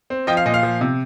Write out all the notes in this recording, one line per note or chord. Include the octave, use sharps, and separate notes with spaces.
C4
F3 D#5 G5
F5
A#2 D#5
F5
F3
C3